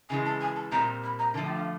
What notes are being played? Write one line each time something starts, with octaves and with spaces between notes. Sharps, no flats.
C#3 E3 G#3 G#5
A5
G#5
A5
A#2 G3 C4 A#5
B5
A#5
D3 F3 A3 A5
G5
F5